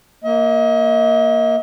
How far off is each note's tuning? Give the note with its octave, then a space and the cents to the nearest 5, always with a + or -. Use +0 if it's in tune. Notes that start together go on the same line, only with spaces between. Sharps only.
A#3 +0 D#5 +40